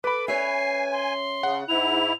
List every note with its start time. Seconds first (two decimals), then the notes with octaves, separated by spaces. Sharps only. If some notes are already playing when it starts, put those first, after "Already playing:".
0.04 A4 B4 B5 D6
0.28 C#4 C#5 E5 G#5 C7
0.92 C6
1.43 C#3 F#5
1.69 G#2 E4 F7